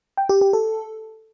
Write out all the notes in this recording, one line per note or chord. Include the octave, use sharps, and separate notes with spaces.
G5
G4
G4
A4